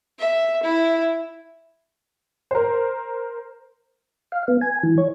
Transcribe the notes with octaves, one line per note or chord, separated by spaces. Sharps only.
E5
E4
A#4 C5
F5
B3
G#5
E3
C#5